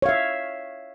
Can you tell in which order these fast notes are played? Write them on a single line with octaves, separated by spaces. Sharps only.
C#5 F5 E5